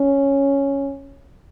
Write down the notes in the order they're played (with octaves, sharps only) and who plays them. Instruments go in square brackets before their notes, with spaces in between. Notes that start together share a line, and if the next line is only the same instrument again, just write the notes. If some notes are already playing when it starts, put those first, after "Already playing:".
Already playing: [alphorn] C#4